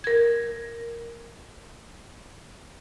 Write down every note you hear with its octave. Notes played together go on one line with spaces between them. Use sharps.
A#4 G#6